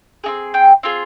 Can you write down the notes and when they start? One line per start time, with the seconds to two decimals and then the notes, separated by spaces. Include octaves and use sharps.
0.24 C4 D#4 G#4
0.54 G5
0.83 C4 F4 G#4